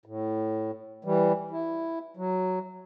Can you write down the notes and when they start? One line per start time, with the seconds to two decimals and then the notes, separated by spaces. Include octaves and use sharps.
0.06 A2
1.05 E3 G3
1.51 E4
2.17 F#3